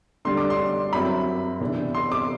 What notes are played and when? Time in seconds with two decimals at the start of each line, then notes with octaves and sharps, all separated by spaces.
0.25 D3 G3 D4 C6
0.37 D6
0.50 C6
0.93 F#2 F#3 C4 E4 B5
1.61 C3 E3 B3 D4
1.95 C6
2.12 D6